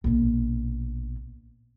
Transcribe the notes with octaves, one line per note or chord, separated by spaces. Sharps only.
A#1 B2